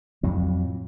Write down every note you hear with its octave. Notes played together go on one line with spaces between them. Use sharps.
F2 A2 F#3